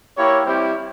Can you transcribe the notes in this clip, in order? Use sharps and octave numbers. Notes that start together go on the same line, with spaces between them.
A#3 E4 G4 C#5
G3 C4 E4 G4 C5